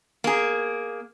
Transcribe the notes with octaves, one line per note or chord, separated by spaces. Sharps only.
A#3 G#4